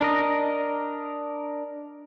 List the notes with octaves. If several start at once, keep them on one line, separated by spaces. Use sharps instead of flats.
D4 A#4 D#5